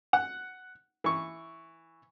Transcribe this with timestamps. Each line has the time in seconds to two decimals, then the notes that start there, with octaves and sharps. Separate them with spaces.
0.13 F#5
1.04 E3 C#6